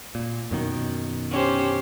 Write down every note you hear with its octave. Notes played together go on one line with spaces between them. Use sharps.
A#2
F#2 B2 D#3
C#4 G4 C5